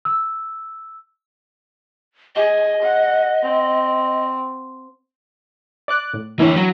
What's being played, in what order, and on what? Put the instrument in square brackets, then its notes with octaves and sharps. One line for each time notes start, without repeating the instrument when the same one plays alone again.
[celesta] E6
[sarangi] G#4 [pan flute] D#5
[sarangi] F#5
C4
[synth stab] D5 D6 F#6
A2
[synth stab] E3 D4 E4 [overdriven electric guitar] A#3 C#5
[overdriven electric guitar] F#3 F#4